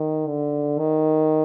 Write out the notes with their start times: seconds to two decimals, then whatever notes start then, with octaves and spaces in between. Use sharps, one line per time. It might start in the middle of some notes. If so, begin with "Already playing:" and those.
Already playing: D#3
0.27 D3
0.78 D#3